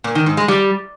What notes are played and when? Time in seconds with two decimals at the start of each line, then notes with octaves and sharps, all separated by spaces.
0.04 A#2
0.15 D#3
0.26 G#2
0.37 G#3
0.48 G3